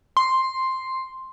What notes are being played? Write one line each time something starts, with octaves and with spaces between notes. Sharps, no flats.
C6